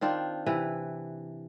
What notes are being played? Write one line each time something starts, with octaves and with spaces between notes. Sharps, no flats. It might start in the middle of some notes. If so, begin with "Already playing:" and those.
D#3 C4 D4 F4
C3 E3 B4